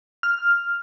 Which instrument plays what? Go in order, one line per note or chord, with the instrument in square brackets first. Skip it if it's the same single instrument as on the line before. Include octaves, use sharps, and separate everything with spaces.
[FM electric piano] F6